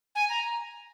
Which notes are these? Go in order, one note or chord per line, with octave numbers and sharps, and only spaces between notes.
G#5
A#5